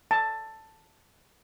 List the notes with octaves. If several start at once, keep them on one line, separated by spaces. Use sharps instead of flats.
A5